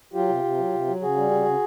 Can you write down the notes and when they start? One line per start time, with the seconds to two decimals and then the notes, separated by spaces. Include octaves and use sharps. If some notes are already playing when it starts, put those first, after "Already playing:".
0.14 F#3 F4 G4
0.29 C3
0.44 C3
0.58 F#3
0.73 C3
0.87 F#3
1.01 C#3 F#4 G#4
1.16 G3
1.31 C#3
1.45 C#3